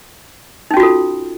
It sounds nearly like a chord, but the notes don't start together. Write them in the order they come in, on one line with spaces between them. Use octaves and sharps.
D#4 C#4 F#4 F4 A4